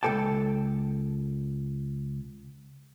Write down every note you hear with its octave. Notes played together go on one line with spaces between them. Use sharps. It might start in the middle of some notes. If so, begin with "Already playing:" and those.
C#2 A#3 A4 G5 A5